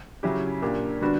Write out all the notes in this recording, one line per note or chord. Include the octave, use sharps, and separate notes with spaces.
C#3 F#3 C#4 E4 G4
A#2 A#3 D4 G4
D3 G3 B3 D4 F#4